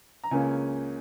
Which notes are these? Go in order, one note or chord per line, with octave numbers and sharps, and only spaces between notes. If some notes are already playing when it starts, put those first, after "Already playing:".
A#5
C#2 C#3 A#3 C#4 G#5